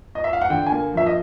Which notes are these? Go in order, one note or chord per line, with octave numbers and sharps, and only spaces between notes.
D#5
E5
F5
F#5
D3 G5
G#5
A#3
F3 E5
D#5